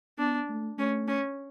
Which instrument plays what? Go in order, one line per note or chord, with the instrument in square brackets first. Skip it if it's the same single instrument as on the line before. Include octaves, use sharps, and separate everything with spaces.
[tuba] B3 [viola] D4
[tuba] A3
[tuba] A3 [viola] C#4
[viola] C#4